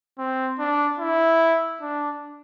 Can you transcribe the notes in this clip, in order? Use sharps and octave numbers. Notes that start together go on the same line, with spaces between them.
C4
D4
E4
D4